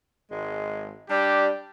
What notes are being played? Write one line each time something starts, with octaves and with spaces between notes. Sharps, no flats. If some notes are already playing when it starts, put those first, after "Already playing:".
G#1 G#3
G3 D4 G4